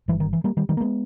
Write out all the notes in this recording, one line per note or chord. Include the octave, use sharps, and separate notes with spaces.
G1 G2 E3
D#3
E3
G3 A#3
D#3 G3
D#3 G3
A#3
G#3 B3